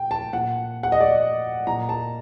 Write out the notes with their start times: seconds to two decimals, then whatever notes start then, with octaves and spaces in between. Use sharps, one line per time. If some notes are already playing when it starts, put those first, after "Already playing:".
Already playing: A#2 G5
0.11 A5
0.33 A#2 F#5
0.83 F#5
0.92 D#5
1.01 D5
1.67 A#2 A#5
1.89 A5